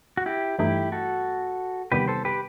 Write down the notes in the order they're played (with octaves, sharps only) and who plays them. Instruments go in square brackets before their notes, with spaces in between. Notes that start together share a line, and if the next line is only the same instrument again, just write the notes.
[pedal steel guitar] F#4
E4 G4
[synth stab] G2 E3 A3 D#4 [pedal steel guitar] E4 G4
[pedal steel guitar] F#4 A4
[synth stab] E2 C3 D#3 G3 B3 [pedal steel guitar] G4 B4
[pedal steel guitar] A4 C5
G4 B4